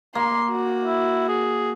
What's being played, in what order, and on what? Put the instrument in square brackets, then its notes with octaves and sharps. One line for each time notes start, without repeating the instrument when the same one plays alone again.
[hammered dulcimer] A#3 [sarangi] C6
[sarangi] F#4
[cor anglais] E4
G#4